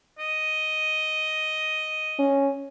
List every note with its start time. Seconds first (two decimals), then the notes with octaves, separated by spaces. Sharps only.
0.19 D#5
2.19 C#4